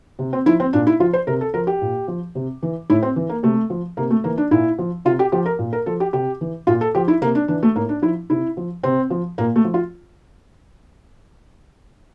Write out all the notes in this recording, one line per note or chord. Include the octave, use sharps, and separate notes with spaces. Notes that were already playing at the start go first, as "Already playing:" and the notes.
C3
C4
F3 E4
C4
A#2 D4
E4
F3 F4
C5
C3 A#4
A4
F3 A#4
G4
A#2
F3
C3
E3
A2 E4
C4
E3
A#3
C3 A3
F3
C3 A#3
A3
E3 A#3
D4
A#2 E4
F3
C3 F4
G4
F3 G4
A#4
A#2
A#4
F3 A4
G4
C3 G4
E3
A#2 F4
A4
F3 G4
E4
C3 A#3
D4
E3 D4
A3
A2 A#3
D4
F3 E4
C3 E4
F3
C3 C4
F3
A#2 A#3
A3
F3
F4